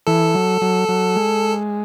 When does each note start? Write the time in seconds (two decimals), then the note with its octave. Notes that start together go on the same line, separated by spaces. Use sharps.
0.07 E3 A4
0.34 F#3
0.62 F#3
0.89 F#3
1.16 G#3